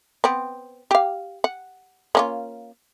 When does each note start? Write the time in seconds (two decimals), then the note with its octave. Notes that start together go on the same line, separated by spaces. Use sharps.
0.24 B3 C4
0.91 G4 F5
1.44 F#5
2.15 A#3 C#4 F4